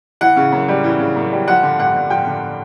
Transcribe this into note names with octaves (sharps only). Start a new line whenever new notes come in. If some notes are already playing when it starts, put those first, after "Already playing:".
E3 F#5
C#3
F#2
G3
E3
C#3
F#2
G3
F3 F#5
D3
G2 F#5
G2
F3 G5
D3